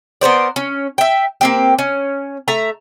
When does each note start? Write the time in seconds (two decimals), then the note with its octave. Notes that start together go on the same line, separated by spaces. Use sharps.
0.21 B3 A#4 C5 D5
0.56 C#4
0.98 E5 G5
1.41 A#3 C4 G4
1.79 C#4
2.48 A3 E5 A#5